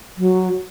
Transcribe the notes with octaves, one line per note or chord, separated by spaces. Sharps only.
F#3